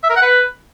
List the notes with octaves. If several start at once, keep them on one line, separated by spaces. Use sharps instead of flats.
E5
A#4
F#5
B4